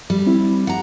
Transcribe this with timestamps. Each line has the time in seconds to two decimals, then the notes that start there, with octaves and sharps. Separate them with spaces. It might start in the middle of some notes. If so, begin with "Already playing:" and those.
0.10 G3
0.26 C4 E4
0.67 F#5 A#5